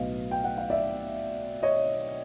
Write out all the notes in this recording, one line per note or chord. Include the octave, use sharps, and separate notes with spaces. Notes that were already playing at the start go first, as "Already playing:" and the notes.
Already playing: B1 A2 F#3 B3 D#5 F5
G5
F#5
F5
D5 E5
C#5 D#5